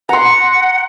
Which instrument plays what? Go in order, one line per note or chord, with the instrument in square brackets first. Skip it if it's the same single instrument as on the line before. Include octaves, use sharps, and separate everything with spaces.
[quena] F#5 [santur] A#5 C6